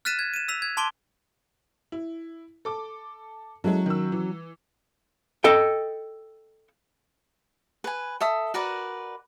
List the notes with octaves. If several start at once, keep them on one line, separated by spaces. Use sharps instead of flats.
F6 F#6 A6 B6 D#7 E7
G#6
D#7 E7
E6 B6 F7
G#6
A5 C6 D6 D7 G7
E4
A4 D6
F#3 G#3 C#4 E4 A4
D#3 E6
E3
A4 D#5 G5
B4 G#5
A4 E5 D#6
F#4 A#4 B4 D5